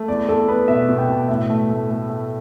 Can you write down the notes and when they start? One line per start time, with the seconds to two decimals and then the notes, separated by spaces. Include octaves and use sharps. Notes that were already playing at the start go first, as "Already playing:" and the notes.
Already playing: A3
0.08 E2 D5
0.28 E2 A4
0.48 B3 B4
0.68 B2 E5
0.89 B2
0.98 G5
1.09 B2
1.28 A2 E5
1.50 A3
1.70 A3
1.90 A3
2.10 A3